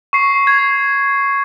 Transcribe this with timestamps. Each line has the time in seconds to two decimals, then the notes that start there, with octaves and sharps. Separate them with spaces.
0.13 C#6 C7
0.47 G#6